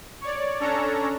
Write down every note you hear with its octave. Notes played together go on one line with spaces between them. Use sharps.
C#5 D5
C#4 D4 A4 C#5 A#5